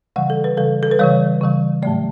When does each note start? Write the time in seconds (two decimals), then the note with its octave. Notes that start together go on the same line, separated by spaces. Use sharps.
0.16 C#3 E3 G3 F#5
0.30 A4
0.44 B4
0.57 C#3 E3 G3 A4
0.83 A4
0.91 B4
0.99 C#3 E3 G3 C#5
1.41 C#3 E3 G3
1.82 A2 F#3 A3 D5